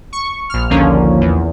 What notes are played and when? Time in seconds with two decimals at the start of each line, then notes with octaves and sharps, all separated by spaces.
0.13 C#6
0.50 A#1 F6
0.70 A#1 D#2 D3 F3 A#3 C#4
1.21 E2